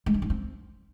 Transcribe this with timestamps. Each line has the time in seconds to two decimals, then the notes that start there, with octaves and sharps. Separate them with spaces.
0.06 G#3
0.14 D#3
0.22 D4
0.30 C4